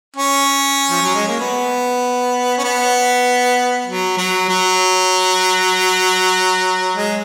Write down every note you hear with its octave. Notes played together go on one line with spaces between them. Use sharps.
C#4
F3
F#3
G#3
A#3
B3
C#4
B3
F#3
F#3
F#3
G#3